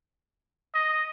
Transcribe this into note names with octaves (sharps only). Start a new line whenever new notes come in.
D#5